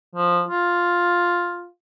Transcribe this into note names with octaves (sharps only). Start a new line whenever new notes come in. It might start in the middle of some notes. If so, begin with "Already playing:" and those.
F3
F4